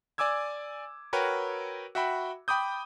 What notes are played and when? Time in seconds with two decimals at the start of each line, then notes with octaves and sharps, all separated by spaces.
0.18 D5 G#5 D6 E6 G#6
1.13 F#4 A#4 B4 C#5 G5
1.95 F#4 E5 G5 B5
2.48 G5 B5 D6 D#6 G6